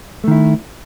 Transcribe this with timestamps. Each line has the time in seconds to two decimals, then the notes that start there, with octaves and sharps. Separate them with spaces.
0.24 A3
0.28 D#3
0.31 E4